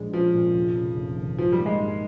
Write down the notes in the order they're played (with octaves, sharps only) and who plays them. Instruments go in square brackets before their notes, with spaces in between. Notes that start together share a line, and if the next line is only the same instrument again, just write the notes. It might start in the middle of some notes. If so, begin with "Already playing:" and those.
Already playing: [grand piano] A#1 G#3
[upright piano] F3 [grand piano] C#4
[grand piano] A#2
F1
C#3
F1
D#2
[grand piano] G#2 [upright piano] F3
[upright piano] G3
[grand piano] A#3
[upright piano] G#3
[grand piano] G#2